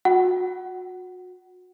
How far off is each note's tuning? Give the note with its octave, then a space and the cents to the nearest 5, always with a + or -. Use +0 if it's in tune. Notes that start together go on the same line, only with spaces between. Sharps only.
F#4 -30 F#5 +20